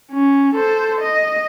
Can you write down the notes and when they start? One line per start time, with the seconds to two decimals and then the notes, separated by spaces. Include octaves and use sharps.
0.11 C#4
0.55 A4 C5
1.01 D#5